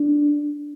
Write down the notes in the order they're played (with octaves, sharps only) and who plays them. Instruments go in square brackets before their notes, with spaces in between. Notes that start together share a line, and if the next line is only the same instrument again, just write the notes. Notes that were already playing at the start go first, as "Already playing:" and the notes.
Already playing: [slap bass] D4